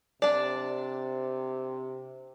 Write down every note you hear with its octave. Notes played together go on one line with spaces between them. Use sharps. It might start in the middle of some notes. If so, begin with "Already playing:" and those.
C3 D4 D5